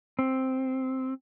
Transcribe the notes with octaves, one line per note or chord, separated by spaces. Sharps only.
C4